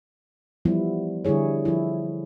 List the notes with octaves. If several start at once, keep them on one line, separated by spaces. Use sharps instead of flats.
E3 F3 G3 B3 E4
D3 G3 E4 G#4 C#5
F3 E4